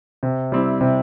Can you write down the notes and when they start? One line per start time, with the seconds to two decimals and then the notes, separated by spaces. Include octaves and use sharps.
0.23 C3
0.52 G3 C4 E4
0.81 C3